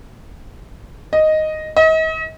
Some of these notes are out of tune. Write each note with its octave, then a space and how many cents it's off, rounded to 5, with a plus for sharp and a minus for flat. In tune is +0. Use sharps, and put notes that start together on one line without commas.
D#5 +0
D#5 +40